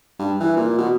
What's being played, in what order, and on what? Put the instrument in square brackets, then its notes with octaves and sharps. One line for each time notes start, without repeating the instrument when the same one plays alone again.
[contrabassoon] G2
E3
A#2
B2